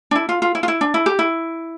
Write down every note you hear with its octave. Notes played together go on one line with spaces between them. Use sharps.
D4
E4
F4
F4
E4
F4
E4
D4
E4
G4
E4